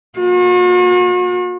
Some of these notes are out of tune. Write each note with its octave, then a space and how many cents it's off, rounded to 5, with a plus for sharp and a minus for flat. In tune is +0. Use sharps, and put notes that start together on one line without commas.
A#3 +0 F#4 -45